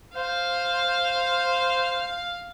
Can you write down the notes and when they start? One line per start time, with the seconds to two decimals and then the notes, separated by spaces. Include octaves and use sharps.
0.16 C5 F5